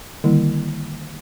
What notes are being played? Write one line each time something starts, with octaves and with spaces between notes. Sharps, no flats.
D3 D#3 G3 A#3 E4